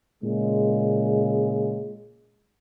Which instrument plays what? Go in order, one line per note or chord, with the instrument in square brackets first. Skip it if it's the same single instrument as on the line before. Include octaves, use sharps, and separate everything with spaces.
[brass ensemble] A#2 C#3 G#3